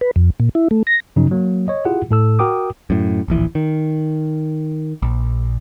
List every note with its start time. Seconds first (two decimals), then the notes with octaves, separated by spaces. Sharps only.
0.01 B4
0.16 F2
0.40 A#2
0.55 E4
0.71 A3
0.87 A#6
1.16 G2 C#3 F3 F#3 C#4 D#4
1.31 F#3 A#3
1.68 C#5 D#5
1.85 E4 F4 G4 G#4 F#5
2.11 A2 A4 E6
2.39 F#4 A#4 G5 D6 D#6
2.90 F#2 A2
3.28 D1 A#1 E3
3.55 D#3
5.02 A#1